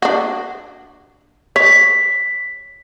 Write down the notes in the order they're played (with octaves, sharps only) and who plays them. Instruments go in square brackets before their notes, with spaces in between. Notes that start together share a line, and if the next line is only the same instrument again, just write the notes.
[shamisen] D4 F#4
[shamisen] C#5 [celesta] B6